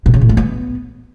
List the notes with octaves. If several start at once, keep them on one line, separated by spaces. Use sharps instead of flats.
B2
C#3
A2
A3
B3